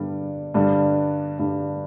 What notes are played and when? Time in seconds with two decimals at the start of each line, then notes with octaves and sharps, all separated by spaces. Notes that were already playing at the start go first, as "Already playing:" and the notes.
Already playing: G2 D3 G3
0.54 G2 D3 G3
1.39 G2 D3 G3